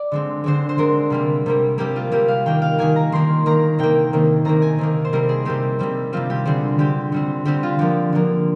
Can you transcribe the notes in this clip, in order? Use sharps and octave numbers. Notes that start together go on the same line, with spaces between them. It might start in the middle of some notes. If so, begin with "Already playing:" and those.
Already playing: D5
D3 G#3 C4
D3 G#3 C4 C5
C5
D3 G#3 C4 A#4
C3 G3 A#3
C3 G3 A#3
C3 G3 A#3 G4
F4
C3 G3 A#3 G4
F5
D#3 A#3 G5
F5
D#3 A#3 G#5
A#5
D#3 A#3 C6
D#3 A#3 A#5
C3 D#3 A#3 G5
C3 D#3 A#3
C3 D#3 A#3 A#5
G#5
C3 D#3 A#3
C5
C3 G3 C4 A#4
G#4
C3 G3 C4 G4
C3 G3 C4
C3 G3 C4 F4
G4
D3 G3 C4 G#4
D3 G3 C4 G4
D3 G3 C4
D3 G3 C4 G4
F4
D3 F3 A#3 G4
D3 F3 A#3